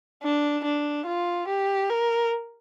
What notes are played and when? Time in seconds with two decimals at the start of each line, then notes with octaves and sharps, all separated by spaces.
0.23 D4
0.65 D4
1.07 F4
1.48 G4
1.90 A#4